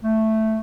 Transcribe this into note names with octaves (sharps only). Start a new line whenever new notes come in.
A3